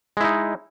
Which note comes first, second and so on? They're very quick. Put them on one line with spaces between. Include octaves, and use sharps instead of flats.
G#3 E4 D#4